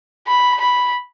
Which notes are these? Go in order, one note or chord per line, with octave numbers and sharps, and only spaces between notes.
B5
B5